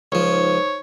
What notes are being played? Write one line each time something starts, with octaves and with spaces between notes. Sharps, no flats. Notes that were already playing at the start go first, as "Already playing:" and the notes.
C#2 F3 D#4 C5 C#5